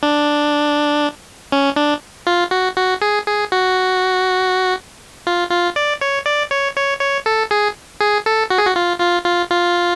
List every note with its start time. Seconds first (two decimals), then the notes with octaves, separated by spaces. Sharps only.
0.03 D4
1.52 C#4
1.76 D4
2.27 F4
2.51 F#4
2.77 F#4
3.02 G#4
3.27 G#4
3.52 F#4
5.27 F4
5.51 F4
5.76 D5
6.01 C#5
6.26 D5
6.51 C#5
6.76 C#5
7.00 C#5
7.26 A4
7.51 G#4
8.01 G#4
8.26 A4
8.50 F#4
8.58 G#4
8.66 F#4
8.76 F4
9.00 F4
9.25 F4
9.50 F4